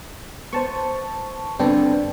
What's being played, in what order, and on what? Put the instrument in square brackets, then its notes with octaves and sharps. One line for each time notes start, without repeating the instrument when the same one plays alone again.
[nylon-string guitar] B3 [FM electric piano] C5 A5 C#6
[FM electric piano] G2 D4 G5 [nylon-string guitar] D3 B3 C4